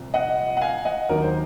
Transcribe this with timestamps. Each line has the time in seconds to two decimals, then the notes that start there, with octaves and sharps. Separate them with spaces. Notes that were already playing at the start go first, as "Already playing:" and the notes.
Already playing: C2 A#2 F3
0.14 D#5 F#5
0.57 F#5
0.61 F5 G#5
0.85 D#5 F#5
1.09 D#2 D#3 F#3 A#4
1.22 C5